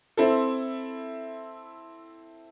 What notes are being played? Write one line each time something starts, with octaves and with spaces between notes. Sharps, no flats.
C4 E4 A4